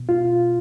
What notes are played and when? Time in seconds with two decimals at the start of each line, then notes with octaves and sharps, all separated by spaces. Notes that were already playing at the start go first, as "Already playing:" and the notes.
Already playing: B2
0.09 F4